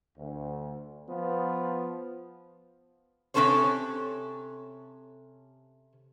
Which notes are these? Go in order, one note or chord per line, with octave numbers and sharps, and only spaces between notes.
D2
F3 B3
C3 E3 C#4 A4 C5 C#5